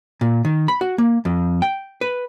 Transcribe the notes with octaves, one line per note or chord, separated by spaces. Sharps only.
A#2
D#3
B5
F#4
A#3
F2
G5
B4